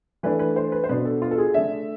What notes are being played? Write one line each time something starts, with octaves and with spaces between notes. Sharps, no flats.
E3 A3 D4 B4
B4
C5
B4
C5
B2 B3 D4 B4
A4
F4
A4
G#4
D3 A3 D4 E5